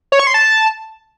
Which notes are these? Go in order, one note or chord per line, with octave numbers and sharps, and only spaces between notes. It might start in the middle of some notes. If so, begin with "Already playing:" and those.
C#5
C#6
C6
A5